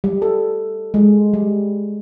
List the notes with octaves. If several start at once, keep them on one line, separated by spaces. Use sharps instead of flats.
G3
A4
G#3
G3